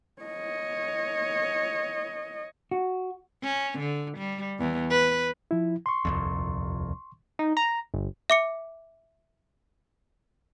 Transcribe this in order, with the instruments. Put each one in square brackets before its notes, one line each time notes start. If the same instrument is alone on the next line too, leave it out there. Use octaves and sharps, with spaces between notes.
[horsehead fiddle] C#5 D#5
[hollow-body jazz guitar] F#4
[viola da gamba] C#4
D3
G3
E2
B4
[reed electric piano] F3 E4
C6 C#6
[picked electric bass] D#1 C2 F2
[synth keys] D#4
A#5
G1
[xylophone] E5 D6 C#7